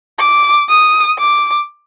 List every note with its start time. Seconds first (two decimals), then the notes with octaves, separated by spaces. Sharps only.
0.19 D6
0.69 D#6
1.19 D6